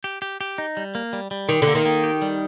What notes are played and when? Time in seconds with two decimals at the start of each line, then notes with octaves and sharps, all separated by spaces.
0.04 G4
0.22 G4
0.41 G4
0.58 D#4
0.77 G3
0.95 A#3
1.13 G3
1.31 G3
1.49 D#3 G4
1.62 D3
1.67 A#3
1.75 D#3
1.85 A#3
2.04 G4
2.22 G3